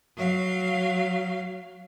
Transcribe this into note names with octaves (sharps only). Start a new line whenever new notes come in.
F#3 F5